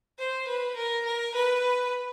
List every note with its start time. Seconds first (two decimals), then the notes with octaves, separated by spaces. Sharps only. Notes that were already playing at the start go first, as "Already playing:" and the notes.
0.19 C5
0.48 B4
0.77 A#4
1.06 A#4
1.35 B4